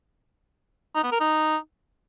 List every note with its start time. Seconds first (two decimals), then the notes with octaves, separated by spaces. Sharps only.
0.95 D#4
1.03 B3
1.12 A#4
1.20 D#4